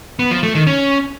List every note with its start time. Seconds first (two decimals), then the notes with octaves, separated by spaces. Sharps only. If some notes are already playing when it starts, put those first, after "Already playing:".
0.19 B3
0.31 F3
0.43 A3
0.55 D#3
0.67 C#4